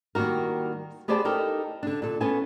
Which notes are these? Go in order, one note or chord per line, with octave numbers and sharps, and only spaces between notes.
D#3 G3 A#3 F#4 A#4
B3 G4 G#4 C5 D5 A5
D#4 G4 A4 A#4
D3 D4
A#2 A4
B3 C#4 A4 G#5 A5